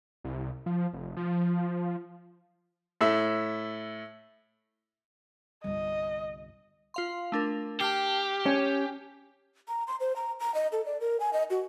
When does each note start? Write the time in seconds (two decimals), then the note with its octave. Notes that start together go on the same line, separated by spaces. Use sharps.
0.24 C2
0.66 F3
0.93 F1
1.17 F3
3.01 A2 A4 E5
5.64 G1 C2 D#5
6.94 F4 F5 C6
7.32 A3 D4 A#4
7.80 G4 A5 F6 C7
8.46 C#4
9.68 A#5
9.87 C6
10.00 C5
10.16 A#5
10.40 A#5
10.55 D#5
10.72 A4
10.86 D5
11.00 A#4
11.20 G#5
11.33 D#5
11.50 F#4